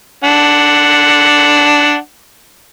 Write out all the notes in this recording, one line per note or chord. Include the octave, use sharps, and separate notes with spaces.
D4 F#5